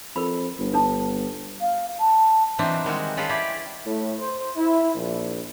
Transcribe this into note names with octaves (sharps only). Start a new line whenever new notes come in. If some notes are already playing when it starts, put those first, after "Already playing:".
F2 A4 A#4 B5
G1
D4 A4 A5
F5
A5
E3 F#3 B3 C4 D4 D#4
D#3 G3 G#3 F#4
C#4 F4 F#4 G#4 A4 B4
E4 G4 D5 G#5
A2
C5
E4
A#1